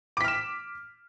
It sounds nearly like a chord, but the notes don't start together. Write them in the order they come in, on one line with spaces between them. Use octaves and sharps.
D6 B6 F6 E7